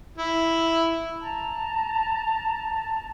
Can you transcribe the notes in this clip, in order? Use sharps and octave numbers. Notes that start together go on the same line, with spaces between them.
E4
A5 A#5